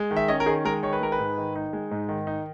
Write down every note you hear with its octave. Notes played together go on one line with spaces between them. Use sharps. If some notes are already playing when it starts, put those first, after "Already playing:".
Already playing: G#3
D#3
E5
C#4 D#5
A#4
D#3 G#4
G#3 A#4
D#3 C#5
B4
G#3 A#4
B4
G#2
D#3
D#4
G#3
G#2
D#3
D#4